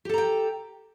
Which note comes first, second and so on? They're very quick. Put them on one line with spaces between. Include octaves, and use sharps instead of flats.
G4 A4 A#5 G5